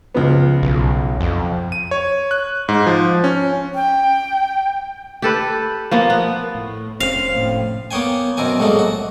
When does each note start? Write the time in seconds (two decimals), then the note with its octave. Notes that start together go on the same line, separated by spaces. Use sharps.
0.15 C#2 F3 B3
0.63 B1
1.21 F2
1.72 D#7
1.91 C#5
2.31 F#6
2.69 G#2
2.86 F3
3.24 C#4
3.75 G5
5.22 G4 A4 B4
5.91 F3 A#3 B3
6.10 B3
6.55 A2
7.00 F1 A#2 C4 C#4 F5
7.33 A2
7.91 A#3 B3 C#5 G5 G#5
8.37 F#2 B2 C4 A#4 G#5
8.60 C2 A2 F#3 G#3 A#3
8.79 F#4